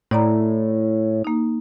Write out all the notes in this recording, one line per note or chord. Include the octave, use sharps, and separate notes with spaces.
A2 E4 D5 A#5
A#3 D#4